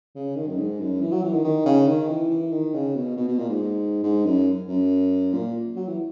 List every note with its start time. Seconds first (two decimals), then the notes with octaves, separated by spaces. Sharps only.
0.15 C#3
0.36 D#3
0.47 F#2
0.58 G#2
0.79 F#2
1.01 E3
1.12 F#3
1.23 E3
1.34 D#3
1.44 D#3
1.66 C#3
1.87 D#3
2.09 E3
2.31 E3
2.52 D#3
2.74 C#3
2.96 B2
3.17 B2
3.28 B2
3.39 A#2
3.49 G#2
4.03 G#2
4.25 F#2
4.68 F#2
5.33 A#2
5.76 F#3
5.88 E3